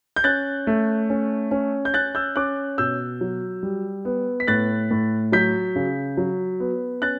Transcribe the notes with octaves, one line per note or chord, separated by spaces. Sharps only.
G6
C#4 F#6 A6
A3
C#4
C#4
G6
C#4 F#6 A6
E6 G6
C#4 D6 F#6
B2 E6 G6
F#3
G3
B3
B6
A2 F#6 A6
A2
F#3 G6 B6
C#3
F#3
B3
C#4 F#6 A6